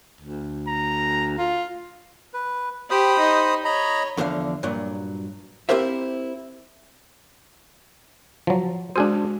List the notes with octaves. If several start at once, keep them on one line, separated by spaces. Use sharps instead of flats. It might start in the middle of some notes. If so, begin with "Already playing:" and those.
D2
A#5
F4
B4
G4 C5 B5 D#6
D#4
C#5 D#5 A#5 B5
E2 D3 F3 D#5 F5
G2 A#2 F#3
C4 E4 G4 A#4 C5 E5
F3 F#3
G#3 D4 F#4 G#4 C5